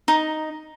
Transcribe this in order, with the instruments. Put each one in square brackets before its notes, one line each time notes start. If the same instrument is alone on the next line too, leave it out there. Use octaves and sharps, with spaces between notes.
[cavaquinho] D#4